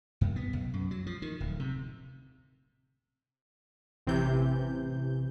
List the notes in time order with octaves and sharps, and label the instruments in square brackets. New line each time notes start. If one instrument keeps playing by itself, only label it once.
[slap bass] F#2
B3
B1
F#2
F#3
F3
D#3
D1
C3
[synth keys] A1 C3 E3 G6